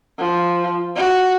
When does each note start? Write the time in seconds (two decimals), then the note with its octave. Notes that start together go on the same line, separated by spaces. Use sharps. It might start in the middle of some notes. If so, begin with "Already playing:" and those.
0.19 F3
0.96 F#4